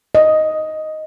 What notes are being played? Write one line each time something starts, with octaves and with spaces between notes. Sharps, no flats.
D#5